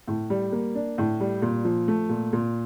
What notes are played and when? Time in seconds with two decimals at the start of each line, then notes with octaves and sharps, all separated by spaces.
0.08 A2
0.30 G3
0.52 A#3
0.75 D4
0.98 A2
1.20 G3
1.42 A#2
1.65 F3
1.88 A3
2.09 A#2
2.33 A#2